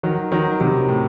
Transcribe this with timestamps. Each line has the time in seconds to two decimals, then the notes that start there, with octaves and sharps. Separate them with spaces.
0.03 D#3 F#3
0.32 D#3 F#3
0.60 C3 D#3
0.89 A2